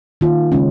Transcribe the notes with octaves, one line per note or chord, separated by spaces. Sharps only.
D#3 A#3 F4
C#3 G#3 C#4